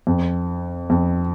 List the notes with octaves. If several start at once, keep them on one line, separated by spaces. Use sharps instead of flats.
F2
F2